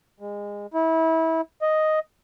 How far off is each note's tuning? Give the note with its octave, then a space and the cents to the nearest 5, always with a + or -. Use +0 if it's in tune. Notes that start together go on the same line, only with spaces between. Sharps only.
G#3 -25
E4 -25
D#5 +0